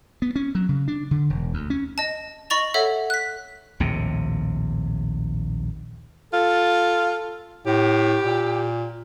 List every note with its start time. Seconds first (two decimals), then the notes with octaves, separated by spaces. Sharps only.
0.22 B3
0.36 C#4
0.55 F#3
0.69 C#3
0.88 D4
1.11 D3
1.30 E1
1.54 D2
1.70 C#4
1.98 D#5 A5
2.50 D#5 B5 C#6 A6 F7
2.74 A4 C#5 E5 F#5
3.10 F#6 B6
3.80 A#1 D#2 A2 C3
6.33 F4 A4
7.66 A2 G4
8.23 A#2